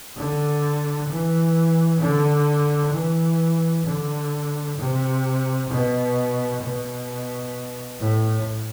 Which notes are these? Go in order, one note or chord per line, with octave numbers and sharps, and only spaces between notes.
D3
E3
D3
E3
D3
C3
B2
B2
A2